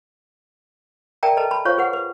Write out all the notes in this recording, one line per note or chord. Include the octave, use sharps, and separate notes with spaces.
A#4 D5 E5 G5 A5 A#5
A4 B4 D#5 A5 A#5
A5 B5
F4 C5 C#5 F5 C#6
G#4 B4 F#5
B4